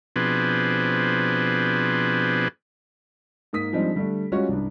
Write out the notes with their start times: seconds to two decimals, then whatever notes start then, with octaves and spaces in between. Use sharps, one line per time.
0.16 B2 F3 C4 D4 G#4 B4
3.53 G#2 A#3 D#6 B6
3.73 F3 G3 G#3 C4 D4 D#4
3.95 D3 G3 A3 D4
4.32 G3 G#3 C#4 F4 F#4 C#5
4.49 C2 G2